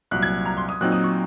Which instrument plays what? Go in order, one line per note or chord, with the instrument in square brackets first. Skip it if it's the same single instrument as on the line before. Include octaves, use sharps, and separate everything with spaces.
[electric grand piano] C2 A#2 F#3 [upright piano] F#6
[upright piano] G#6
A#5
C6
D#6
[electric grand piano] A#2 F#3 C4 D#4 [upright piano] F#6
[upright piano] D#6
C#6